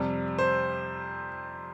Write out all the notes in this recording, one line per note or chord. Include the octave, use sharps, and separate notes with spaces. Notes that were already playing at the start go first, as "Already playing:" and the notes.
Already playing: F2 C3 G3
C5